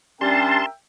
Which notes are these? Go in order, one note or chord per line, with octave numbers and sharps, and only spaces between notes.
G3 C#4 D4 A#4 E5 G5 A5 C6